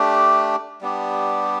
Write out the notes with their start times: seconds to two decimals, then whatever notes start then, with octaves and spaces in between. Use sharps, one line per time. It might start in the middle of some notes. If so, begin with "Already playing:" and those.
Already playing: A3 D4 G4
0.81 G3 B3 D4 G4